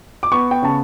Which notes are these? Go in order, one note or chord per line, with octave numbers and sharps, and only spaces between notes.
D6
B3 C#6
G5
C#3 A5